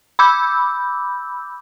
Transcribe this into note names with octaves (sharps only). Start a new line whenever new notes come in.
B5 D6 E6 G6